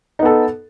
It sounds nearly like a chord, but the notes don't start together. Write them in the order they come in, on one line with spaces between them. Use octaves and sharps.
D#4 B3 A4